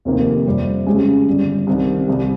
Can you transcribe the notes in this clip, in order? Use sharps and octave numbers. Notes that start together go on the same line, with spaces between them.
F1 F2 C3 D#3 A#3
F2 C3 G3
C#2 C#3 G#3 C#4 G4
G1 G2 G3
C2 C3 D#3
C2 C3 G3